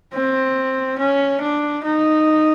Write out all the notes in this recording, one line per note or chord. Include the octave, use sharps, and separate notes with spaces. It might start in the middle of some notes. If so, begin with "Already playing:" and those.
C4
C#4
D4
D#4